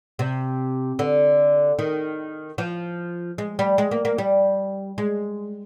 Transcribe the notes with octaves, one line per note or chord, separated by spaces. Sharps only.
C3
D3
D#3
F3
G#3
G3
G#3
A#3
A#3
G3
G#3